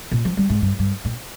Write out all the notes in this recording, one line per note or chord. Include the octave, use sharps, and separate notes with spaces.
A#2
F3
G3
G#2
G2
G2
A#2